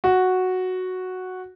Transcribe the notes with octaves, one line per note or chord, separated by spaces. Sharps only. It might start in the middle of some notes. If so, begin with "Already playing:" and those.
F#4